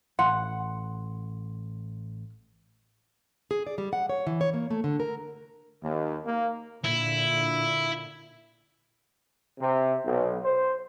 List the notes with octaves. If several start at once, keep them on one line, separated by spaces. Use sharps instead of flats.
A1 F#5 C6
G#4
D5
G3
F#5
C#5
E3
C#5
A#3
A3
D3
A#4
D#2
A#3
A#2 D3 E4
C3
B1
C5